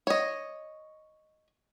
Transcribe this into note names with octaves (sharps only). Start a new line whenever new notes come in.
C#5 D#5